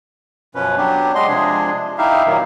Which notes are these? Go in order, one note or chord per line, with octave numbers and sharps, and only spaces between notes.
F#2 B2 F3 C#4 B4
F#3 B3 D4 G4
G3 G#3 D#5 C6
C3 F3 G#3 D4 G#4
D#4 E4 G4 E5 F5
A#2 D#3 F#3 A#3 B3